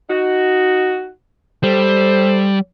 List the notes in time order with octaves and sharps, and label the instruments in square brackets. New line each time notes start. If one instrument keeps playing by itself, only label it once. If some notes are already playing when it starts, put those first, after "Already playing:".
[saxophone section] D#4 F#4
[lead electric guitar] G3 [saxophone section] A4 C5